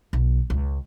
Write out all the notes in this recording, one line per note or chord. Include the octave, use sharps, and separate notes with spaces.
B1
C#2